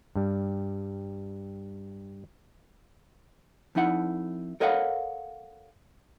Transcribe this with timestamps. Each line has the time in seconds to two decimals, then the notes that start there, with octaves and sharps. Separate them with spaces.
0.15 G2 G3
3.75 F2 F3 D#4 E4 F#5
4.60 A4 A#4 C#5 D#5 F5 F#5